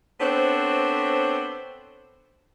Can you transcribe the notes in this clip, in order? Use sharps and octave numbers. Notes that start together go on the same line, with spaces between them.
B3 C4 D4 A4 C5 C#5